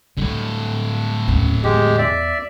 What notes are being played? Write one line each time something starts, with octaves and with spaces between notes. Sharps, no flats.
A2 D3 G3
D#1 C#4
E2 G#3 G4
D5 E5